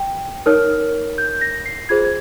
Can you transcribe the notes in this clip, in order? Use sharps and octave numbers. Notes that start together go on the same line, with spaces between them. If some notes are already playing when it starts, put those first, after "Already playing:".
Already playing: G5
D#4 A#4 C#5 F6
G6
A#6
C7
F4 G#4 C5 G#6
G#6